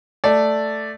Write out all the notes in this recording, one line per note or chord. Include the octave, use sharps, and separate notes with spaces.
A3 D5